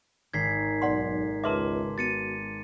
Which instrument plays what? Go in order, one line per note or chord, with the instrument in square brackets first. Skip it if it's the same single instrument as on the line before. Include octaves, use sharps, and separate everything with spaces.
[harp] G#1 [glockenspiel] G#6 B6 C7
[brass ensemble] B1 [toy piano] D5 F#5 C6
[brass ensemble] C#2 [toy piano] A#4 B4 E5 [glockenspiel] A5 C6 D6
[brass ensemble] B3 F#4 [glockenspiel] A6 C#7 D#7